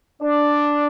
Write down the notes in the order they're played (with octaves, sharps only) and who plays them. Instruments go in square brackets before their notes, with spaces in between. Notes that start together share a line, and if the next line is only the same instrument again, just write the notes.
[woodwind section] D4 [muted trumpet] D5